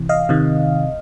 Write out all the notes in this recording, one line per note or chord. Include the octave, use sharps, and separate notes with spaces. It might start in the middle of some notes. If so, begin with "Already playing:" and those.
Already playing: C3 E3
D#5 F5
C3 D#3